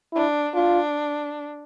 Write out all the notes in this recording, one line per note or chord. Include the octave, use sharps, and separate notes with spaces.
D4 E4
D4 F4